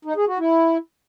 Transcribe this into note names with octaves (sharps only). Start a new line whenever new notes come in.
D#4
G#4
F#4
E4